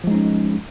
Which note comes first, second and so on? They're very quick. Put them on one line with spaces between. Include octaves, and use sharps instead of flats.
F3 G#3 D#4 C#4